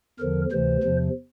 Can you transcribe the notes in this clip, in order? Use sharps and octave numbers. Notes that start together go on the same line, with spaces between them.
E2 D3 F3 A#4
D2 C3 E3 C5
E2 C3 F3